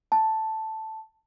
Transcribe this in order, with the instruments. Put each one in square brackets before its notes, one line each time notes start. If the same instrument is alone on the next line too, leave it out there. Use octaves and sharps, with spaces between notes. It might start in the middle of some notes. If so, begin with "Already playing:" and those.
[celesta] A5